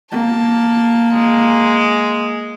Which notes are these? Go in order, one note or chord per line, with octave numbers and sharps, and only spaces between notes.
A#3 A5
G#3